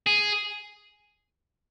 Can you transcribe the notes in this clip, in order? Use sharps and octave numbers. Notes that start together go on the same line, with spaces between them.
G#4